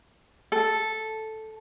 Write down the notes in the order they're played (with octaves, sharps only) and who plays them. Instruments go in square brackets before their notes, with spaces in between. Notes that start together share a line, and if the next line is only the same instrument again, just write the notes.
[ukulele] A4